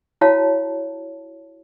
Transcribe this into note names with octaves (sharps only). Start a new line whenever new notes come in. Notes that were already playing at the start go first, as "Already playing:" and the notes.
E4 F#4 C#5 F5 A5